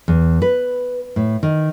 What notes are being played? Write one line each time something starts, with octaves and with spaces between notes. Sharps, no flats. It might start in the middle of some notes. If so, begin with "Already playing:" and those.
E2
B4
A2
D#3